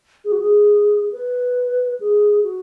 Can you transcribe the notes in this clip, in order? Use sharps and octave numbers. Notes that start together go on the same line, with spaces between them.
G#4
F#4
G#4
B4
G#4
F#4